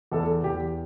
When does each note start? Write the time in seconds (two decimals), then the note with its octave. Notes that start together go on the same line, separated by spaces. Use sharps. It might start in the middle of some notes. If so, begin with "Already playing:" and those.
0.12 E2 A4
0.43 E2 G4